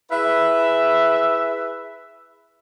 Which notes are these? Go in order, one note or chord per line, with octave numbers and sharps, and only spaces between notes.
E4 G#4 B4 E5